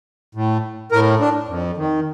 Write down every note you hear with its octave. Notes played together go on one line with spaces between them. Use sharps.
A2
A2 A#4
D4
F2
D#3